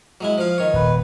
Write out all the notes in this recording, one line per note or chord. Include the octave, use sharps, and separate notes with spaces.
F#3 G#3 E4
F3 F5
D#3 C#5
D#1 B4